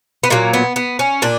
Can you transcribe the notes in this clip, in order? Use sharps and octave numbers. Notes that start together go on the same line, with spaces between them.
B3
A#2 F#3 A#3
B3
B3
C#4
A#2 D4